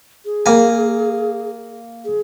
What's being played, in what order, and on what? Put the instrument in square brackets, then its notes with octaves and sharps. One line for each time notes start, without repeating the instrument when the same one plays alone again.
[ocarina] G#4
[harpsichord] A#3 G#5
[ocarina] G#4